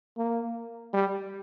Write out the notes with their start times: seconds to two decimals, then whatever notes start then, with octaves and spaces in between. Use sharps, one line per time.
0.17 A#3
0.93 G3